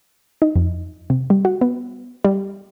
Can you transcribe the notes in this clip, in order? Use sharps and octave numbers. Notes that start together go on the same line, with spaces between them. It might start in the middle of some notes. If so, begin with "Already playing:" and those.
D#4
F2
C3
G3
F#4
B3
G3